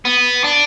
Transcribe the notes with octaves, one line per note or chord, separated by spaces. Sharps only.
B3
D4